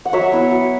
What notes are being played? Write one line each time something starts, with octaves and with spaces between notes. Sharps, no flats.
F#5
F#3 C#5 E5
B3 E4
F#3